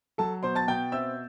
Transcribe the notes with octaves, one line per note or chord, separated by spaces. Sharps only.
F#3 A4 A5
B2 C5 C6
A5 A6
B2 G5 G6
C4 E5 E6